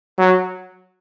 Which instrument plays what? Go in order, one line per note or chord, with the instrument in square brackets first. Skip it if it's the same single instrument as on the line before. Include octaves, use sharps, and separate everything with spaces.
[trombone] F#3